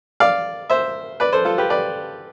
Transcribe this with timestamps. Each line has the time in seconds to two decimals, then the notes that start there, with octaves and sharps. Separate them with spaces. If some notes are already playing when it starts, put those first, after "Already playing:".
0.20 D5 F5
0.70 C5 E5
1.20 B4 D5
1.33 A4 C5
1.45 F4 A4
1.58 G4 B4
1.70 B4 D5